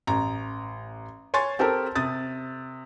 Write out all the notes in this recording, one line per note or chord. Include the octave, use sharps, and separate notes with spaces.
A1 A#5
C#5 G#5 C6 C#6 A6
C4 G4 A4 A#4
C3 D#6 A6